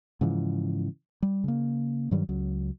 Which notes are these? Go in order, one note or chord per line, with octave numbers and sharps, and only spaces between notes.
G#2 C#3 E3 F3
G3
C#3 A#3
G2 D#3 F#3 G3
C#2 F#3